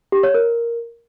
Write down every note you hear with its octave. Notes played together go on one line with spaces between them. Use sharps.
G4
C#5
A#4